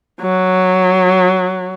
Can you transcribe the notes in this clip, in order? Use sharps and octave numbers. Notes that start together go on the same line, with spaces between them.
F#3